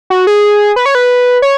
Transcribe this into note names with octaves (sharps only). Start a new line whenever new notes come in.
F#4
G#4
B4
C#5
B4
C#5